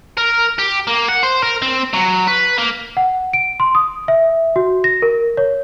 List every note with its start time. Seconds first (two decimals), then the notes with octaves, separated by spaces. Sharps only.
0.18 A#4
0.58 G4
0.87 A#3
1.08 F#5
1.23 C5
1.43 A#4
1.62 C4
1.94 F#3
2.28 B4
2.58 A#3
2.97 F#5
3.33 D7
3.60 C6
3.75 D#6
4.08 E5
4.56 F#4
4.84 A#6
5.02 A#4
5.37 C#5